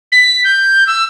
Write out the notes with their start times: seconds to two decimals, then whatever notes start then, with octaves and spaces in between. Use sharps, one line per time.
0.12 B6
0.45 G6
0.87 E6